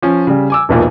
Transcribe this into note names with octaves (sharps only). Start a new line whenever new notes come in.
F3 C#4
C#3 G3
G#5 D6 E6
E1 B1 A#2 A#3